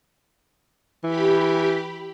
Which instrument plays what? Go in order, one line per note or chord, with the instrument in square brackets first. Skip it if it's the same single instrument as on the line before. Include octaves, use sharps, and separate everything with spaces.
[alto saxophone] E3 [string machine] G4 B5